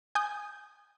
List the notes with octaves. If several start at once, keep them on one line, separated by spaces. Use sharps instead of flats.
G#5 D#6 G6